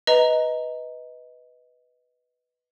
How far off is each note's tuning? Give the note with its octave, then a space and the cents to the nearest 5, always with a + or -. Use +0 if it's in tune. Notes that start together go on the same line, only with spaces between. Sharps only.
B4 +0 D#5 +15 A#5 +0